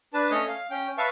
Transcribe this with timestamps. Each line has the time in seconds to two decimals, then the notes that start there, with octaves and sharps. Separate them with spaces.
0.14 D4 B4 A5
0.31 A3 C#4 C#5 D#5
0.48 F5
0.70 C#4 G5
0.98 B4 E5 F5 A5 C#6